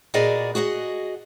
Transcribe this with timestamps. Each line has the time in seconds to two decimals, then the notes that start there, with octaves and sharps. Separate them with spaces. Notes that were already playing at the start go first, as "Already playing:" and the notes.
0.14 A#2 B3 F#4 G#4 D5 D#5
0.55 F#4 G#4 D#5 F#5